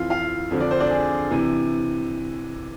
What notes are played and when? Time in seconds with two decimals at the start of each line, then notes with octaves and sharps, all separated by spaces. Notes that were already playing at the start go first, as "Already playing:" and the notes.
Already playing: F2 E3 F4 F5
0.10 F4 F5
0.51 F2 D3 F3
0.60 D4 D5
0.71 C4 C5
0.80 D4 D5
0.90 G#4
1.31 C3 E3